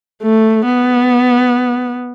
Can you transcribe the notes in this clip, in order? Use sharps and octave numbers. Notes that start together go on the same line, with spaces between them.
A3
B3